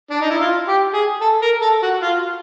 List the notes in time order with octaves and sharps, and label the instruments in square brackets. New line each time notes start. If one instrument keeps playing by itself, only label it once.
[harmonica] D4
D#4
E4
F4
G4
G#4
A4
A#4
A4
F#4
F4